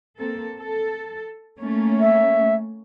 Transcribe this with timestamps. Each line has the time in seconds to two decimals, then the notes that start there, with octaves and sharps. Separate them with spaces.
0.16 A#3 C4 A4
0.57 A4
1.59 A3 A#3 C#4
2.00 E5